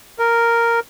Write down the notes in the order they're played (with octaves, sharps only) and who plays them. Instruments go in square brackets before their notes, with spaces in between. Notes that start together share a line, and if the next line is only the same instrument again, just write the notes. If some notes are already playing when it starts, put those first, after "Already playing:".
[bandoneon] A#4